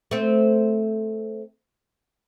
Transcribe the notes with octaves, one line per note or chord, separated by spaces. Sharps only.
A3 C4